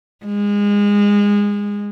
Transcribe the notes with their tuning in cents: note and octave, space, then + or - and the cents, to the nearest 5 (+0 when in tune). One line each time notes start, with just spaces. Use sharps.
G#3 -25